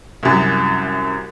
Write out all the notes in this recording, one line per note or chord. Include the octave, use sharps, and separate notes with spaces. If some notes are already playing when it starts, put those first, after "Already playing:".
C2 F#2